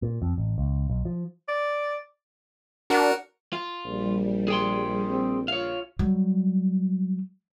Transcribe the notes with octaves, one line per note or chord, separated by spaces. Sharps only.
A#2
F2
A1
C#2
B1
F3
D5
D4 F#4 A#4 F#5
F4
A#1 G3
G#4 G5 C6
C4
F4 C#5 F5
F#3 G3